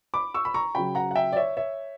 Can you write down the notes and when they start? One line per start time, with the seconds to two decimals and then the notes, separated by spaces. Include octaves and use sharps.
0.14 B5 D6
0.34 C#6 E6
0.45 B5
0.54 A#5 C#6
0.75 C#3 F#3 G5 B5
0.95 F#5 A#5
1.11 F#5
1.16 E5 G5
1.32 D5
1.36 C#5 E5
1.57 C#5 E5